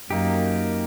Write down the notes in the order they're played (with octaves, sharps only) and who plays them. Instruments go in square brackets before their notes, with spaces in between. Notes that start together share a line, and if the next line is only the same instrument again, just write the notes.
[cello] F#2 [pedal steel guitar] A#3 D#4 G4